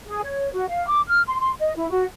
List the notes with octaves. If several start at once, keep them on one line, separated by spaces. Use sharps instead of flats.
G#4
C#5
F#4
F5
D6
F6
C6
C6
D#5
E4
F#4